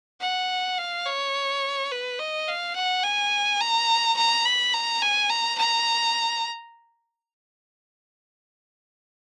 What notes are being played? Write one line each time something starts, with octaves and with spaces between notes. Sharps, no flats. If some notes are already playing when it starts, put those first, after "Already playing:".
F#5
F5
C#5
B4
D#5
F5
F#5
G#5
A#5
A#5
B5
A#5
G#5
A#5
A#5